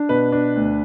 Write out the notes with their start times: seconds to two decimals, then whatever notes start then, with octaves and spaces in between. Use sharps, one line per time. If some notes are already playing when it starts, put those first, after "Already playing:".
Already playing: D4
0.09 B2 B4
0.32 D4
0.56 D2